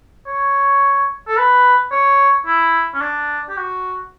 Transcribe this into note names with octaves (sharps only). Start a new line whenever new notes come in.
C#5
A4
B4
C#5
E4
C#4
D4
G4
F#4